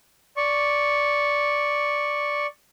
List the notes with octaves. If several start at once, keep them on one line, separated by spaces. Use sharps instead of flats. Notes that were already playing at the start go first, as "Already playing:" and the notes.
D5 C#6